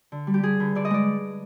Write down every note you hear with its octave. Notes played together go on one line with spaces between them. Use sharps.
D3
G3
G4
G3 G#4
D3 B4
D3 D5
D#5
G#3 D5